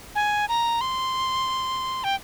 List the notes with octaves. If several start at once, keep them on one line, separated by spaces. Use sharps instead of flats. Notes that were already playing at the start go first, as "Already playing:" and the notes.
G#5
A#5
C6
G5